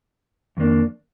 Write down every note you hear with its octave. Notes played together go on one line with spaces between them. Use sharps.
F2 D#3 A#3 D4